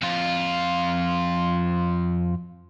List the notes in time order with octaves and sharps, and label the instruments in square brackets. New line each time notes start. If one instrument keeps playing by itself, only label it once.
[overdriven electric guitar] F2 F4